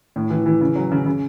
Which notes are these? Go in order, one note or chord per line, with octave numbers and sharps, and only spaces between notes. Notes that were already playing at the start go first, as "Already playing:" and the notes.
A2
E3
E3
C#3
F#3
C#3
C#3